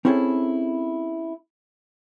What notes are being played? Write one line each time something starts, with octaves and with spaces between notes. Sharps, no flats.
C4 C#4 E4 G#4 A4